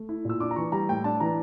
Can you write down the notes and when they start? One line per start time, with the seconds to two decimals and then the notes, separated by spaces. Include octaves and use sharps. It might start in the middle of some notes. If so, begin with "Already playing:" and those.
Already playing: A3
0.09 E4
0.25 A#2 E6
0.40 D4 D6
0.51 A#5
0.56 E3 C#6
0.72 G3 A#5
0.89 A2 G5
1.04 D4 A5
1.20 E3 A#5